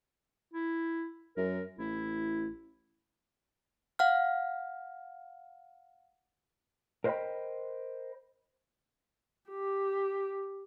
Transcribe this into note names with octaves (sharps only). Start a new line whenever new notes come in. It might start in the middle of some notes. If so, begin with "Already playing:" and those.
E4
F#2 A#4
A1 E4
F5 F#5 F6
A#4 C5 D#5 E5 G5 B5
G4